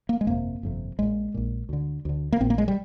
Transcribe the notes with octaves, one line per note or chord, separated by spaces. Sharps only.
A#3
G#3
G1 F2 C3 A#3
G1 F2 C3
A#1 A#2 G#3
A#1 A#2
D2 D3
D2 D3
A#3
A#1 A#2 C4
A#3
G#3
G3